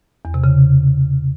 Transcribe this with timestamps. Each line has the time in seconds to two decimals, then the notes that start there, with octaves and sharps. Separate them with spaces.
0.25 E2
0.34 C3
0.44 C#3